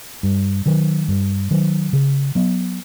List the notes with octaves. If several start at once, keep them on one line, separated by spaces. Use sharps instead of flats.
G2
D#3 F#3
G2
D#3 F#3
C#3
F#3 B3